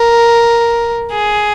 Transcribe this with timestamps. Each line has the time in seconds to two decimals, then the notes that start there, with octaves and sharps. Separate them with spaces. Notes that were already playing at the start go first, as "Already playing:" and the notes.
Already playing: A#4
1.11 G#4